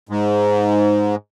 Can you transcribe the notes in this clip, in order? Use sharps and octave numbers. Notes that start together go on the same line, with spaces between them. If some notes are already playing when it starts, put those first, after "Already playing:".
G#2